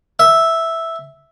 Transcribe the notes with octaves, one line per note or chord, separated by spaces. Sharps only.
E5